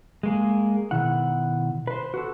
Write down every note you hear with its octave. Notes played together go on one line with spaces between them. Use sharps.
G#3 A#3 G#4
B2 D#3 E4 F#5
B4 C5
F#4 A4